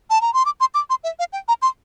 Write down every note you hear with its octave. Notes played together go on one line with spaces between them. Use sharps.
A5
A#5
C6
D6
C6
D6
C6
E5
F5
G5
A#5
C6